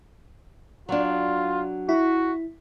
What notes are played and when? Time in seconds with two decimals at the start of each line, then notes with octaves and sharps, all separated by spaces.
0.89 F#3 D4 F4
1.89 E4 F#4